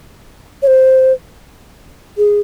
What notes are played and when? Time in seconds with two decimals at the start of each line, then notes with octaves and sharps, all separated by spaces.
0.62 C#5
0.67 C5
2.17 G#4